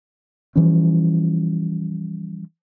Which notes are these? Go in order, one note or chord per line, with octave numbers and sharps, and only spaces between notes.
E3 F3 G3 C#4